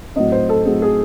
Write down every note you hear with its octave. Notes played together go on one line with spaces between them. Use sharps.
A2 F#3 C4 D#5
C5
A4
A2 F#3 C4 G#4
G#4